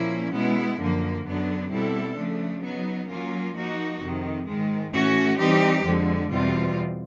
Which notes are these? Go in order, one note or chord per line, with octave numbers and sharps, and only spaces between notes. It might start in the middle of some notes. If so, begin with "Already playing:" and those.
Already playing: A#2 F3 A#3 C#4 E4
B2 G#3 B3 E4
F#2 D3 F3 A#3
F#2 D3 F#3 B3 D4
B2 G3 C4 E4 A4
C#3 F3 A3 D4
F#3 B3 D#4
F#3 A#3 C#4 F4
F3 A#3 D#4 F#4
F2 C3 D#3
G#2 D#3 G#3
A2 E3 A3 C#4 F#4
E3 G3 C4 D#4 G4
F2 D3 F3 G#3
E2 B2 G3 C4 F4